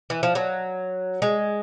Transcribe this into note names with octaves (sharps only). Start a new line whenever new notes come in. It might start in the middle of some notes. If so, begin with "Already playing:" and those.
E3
F3
F#3
G#3